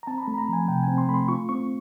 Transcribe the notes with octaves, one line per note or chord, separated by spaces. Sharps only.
A#5
C4 A5
B5
A3 A#5
B5
A#5
F3 G#5
C3 G5
C4 G#5
C6
A3 B5
C6
F4 C#6
C4 C#6